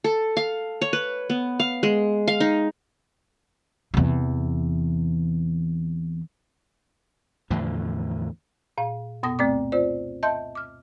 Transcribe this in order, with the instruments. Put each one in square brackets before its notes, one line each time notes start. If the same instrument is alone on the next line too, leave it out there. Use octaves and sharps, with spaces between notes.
[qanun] A4
F5
C#5
B4
B3
F5
G#3
F5
D#4
[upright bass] E2 C3
[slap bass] E2 A2 D3 F3
[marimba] A#2 F5
F#2 B2 B3 D#6 A#6
D2 A3 C4 D5 D6
F4 C5 D5
D#5 E5 A5 C6 G6
D6 F6